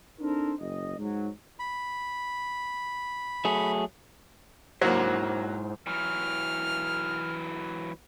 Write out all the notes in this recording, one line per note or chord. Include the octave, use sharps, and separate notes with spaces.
C4 D4 D#4 A4 A#4 C5
F#1 D#5
G#2 F#3
B5
F#3 A3 G#4
G#2 F#3 A#3 E4 C5
E3 F#3 F6